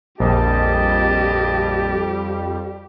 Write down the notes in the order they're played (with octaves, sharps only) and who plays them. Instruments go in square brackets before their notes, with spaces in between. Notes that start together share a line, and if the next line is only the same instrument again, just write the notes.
[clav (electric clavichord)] A#1 [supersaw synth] F2 G3 [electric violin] G4 [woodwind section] D#5 A5